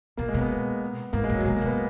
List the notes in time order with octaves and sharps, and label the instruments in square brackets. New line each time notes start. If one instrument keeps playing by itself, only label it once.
[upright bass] B2 [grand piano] A#3
[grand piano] G#3
[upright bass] B2 [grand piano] B3
[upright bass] G#2 [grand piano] A#3
[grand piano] G#3
[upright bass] A#2
[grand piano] F#3
[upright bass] A#2
[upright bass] B2 [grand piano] G#3
[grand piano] A#3
[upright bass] B2 [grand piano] B3